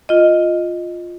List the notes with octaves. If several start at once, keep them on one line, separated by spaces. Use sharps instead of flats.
F4 D#5